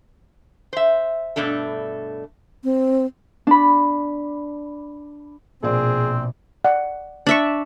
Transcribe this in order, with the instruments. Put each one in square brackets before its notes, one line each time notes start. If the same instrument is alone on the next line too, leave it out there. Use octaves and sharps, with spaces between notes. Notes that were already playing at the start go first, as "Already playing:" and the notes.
[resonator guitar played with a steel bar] C5 E5
G2 B2 A3 D4 A4
[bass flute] C4
[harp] D4 B5
[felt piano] A#1 D5 [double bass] B2 [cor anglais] C4 [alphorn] G#4
[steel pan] D5 F#5
[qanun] D4 E5 C#6